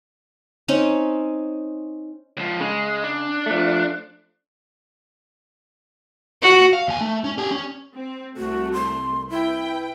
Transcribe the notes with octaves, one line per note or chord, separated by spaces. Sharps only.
C4 C#4 D#4
C#2 F3
C#3 G#3
D4
F3 A3
F#4
F5
D#2 G#5
A3
C#4
G4 G#5
C#4
C4
C2 A3 F#4
C6
E4 B4 G5